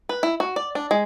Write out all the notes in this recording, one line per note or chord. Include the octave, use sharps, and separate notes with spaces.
B4
E4
F#4
D5
D4
G#3